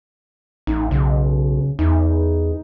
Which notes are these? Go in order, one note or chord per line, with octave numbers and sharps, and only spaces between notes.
A1 D#4
B1 C#3
E2 D#4